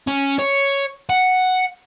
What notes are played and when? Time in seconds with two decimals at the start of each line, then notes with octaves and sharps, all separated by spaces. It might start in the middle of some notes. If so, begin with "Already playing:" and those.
0.07 C#4
0.39 C#5
1.09 F#5